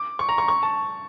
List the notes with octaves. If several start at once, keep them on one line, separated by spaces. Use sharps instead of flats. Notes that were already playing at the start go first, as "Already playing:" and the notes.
Already playing: D6
C#6
A#5
C#6
C#6
A5